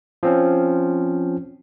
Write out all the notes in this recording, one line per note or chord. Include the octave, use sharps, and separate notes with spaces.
F3 C4 C#4